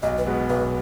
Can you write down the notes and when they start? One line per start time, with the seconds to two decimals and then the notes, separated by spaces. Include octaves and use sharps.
0.02 B1 D#5
0.18 B4
0.26 B2 G#3 B3 F#4
0.49 B1 B4